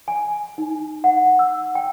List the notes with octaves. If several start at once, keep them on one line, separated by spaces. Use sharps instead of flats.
G#5
D#4
F#5
E6
G5